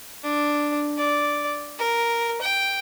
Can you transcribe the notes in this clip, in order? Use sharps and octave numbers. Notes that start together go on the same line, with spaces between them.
D4
D5
A#4
G5